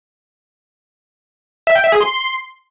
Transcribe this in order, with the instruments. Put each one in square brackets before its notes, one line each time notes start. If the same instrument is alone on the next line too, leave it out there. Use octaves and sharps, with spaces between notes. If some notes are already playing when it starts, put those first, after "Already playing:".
[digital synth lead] E5
G5
E5
G#4
C6